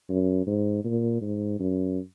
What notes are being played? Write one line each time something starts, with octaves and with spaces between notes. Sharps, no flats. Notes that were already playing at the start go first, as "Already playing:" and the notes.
F#2
G#2
A#2
G#2
F#2